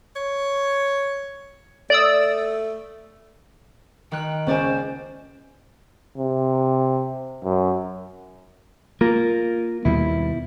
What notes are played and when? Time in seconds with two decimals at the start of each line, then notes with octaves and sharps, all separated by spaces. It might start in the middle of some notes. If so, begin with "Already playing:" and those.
0.16 C#5
1.90 A3 D5 D#6 E6
4.12 D#3 G5 F#6
4.47 C#2 C#4 C5 D5 G#5
6.18 C3
7.44 F#2
9.01 A#3 F4 A#4
9.85 D#2 B2 G3 E4